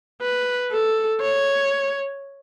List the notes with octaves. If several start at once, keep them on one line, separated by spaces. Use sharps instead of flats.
B4
A4
C#5